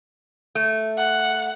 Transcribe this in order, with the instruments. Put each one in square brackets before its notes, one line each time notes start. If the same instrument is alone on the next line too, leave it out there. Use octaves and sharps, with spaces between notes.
[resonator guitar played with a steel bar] A3
[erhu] F#5